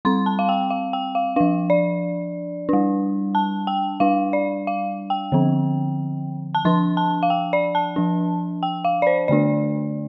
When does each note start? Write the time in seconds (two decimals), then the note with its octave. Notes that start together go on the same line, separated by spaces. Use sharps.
0.05 G3 C4 C6
0.26 A5
0.39 F5
0.49 G5
0.70 F5
0.93 G5
1.15 F5
1.36 F3 D4 F5
1.70 D5
2.69 G3 D4
3.35 A5
3.67 G5
4.00 G3 D4 F5
4.33 D5
4.67 F5
5.10 G5
5.32 D3 F3 C4
6.55 A5
6.65 F3 D4 C6
6.97 A5
7.23 F5
7.30 G5
7.53 D5
7.75 A5
7.96 F3 D4
8.63 G5
8.85 F5
9.02 D5
9.07 C5
9.28 D3 A3 D4 D5